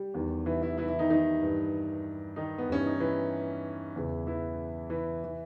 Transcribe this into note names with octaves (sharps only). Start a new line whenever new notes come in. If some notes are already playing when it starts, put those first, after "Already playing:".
Already playing: G3 G4
E2 D#3
E3 E4
E3 E4
E3 E4
E3 E4
D#3 D#4
D#3 D#4
G2 E3
D#3 D#4
B3
G2 E3 C#4
D#4
E3 E4
E2 C#3 E3
E3 E4
E3 E4
E3